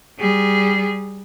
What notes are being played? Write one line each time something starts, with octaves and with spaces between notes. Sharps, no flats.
G3 G#4